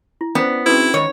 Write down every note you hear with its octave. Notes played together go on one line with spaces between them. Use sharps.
E4
B3 C#4 C5 D5
C4 C#4 D#4 E4 F#4 G#4 B4
D#3 C#5 D#5 B5